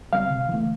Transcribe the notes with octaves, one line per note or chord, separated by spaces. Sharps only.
G3 C4 F5
C3
E3 A3